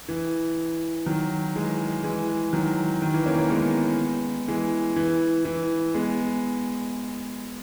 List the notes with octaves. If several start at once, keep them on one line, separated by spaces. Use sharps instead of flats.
E3
D#3 F#3
E3 G#3
E3 G#3
D#3 F#3
D#3
E3
A#3 C#4
A#3 C#4
G#3 B3
E3 G#3
E3
E3
G#3 B3